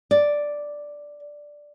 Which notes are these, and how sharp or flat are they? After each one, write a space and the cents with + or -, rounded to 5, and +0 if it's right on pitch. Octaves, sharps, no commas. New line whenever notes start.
D5 +0